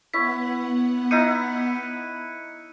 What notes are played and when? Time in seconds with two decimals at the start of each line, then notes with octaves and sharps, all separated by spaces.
0.14 B3 E4 C#5 F#5 B6
1.11 D#4 E4 A#5 F#6 C#7 D#7